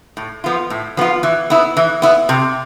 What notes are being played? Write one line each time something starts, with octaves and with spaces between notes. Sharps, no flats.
A2
F3 B3 F4
A2
F3 B3 F4
E3
B3 E4
E3
B3 E4
C3